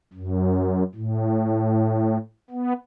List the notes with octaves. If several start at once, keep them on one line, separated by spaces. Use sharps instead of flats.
F#2
A2
B3